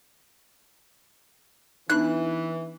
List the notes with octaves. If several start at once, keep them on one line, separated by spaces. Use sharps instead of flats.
E3 B3 D4 D#4 F#6